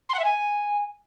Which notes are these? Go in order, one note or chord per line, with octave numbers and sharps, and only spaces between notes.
C6
F#5
E5
G#5